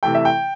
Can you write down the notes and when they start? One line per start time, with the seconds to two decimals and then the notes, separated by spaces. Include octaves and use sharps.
0.03 C3 E3 A3 G5
0.15 E5
0.25 G5